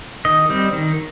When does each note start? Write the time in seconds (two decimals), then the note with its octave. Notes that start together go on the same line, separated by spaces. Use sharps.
0.25 D#3 D#5
0.49 G3 C4
0.73 D#3